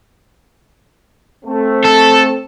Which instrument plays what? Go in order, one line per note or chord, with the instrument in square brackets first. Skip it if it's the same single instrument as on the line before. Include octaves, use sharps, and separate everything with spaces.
[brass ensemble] A3 C4
[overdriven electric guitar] A4